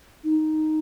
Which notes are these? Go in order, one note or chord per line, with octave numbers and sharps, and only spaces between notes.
D#4